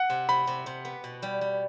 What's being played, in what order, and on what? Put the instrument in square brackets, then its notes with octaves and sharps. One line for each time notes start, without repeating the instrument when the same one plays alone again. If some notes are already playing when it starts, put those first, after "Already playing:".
Already playing: [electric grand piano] F#5
[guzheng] C3
[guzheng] C3 [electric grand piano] B5
[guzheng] C3
C3
B3
B2
G3
G3